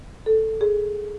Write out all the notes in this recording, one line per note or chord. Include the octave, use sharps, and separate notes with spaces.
A4
G#4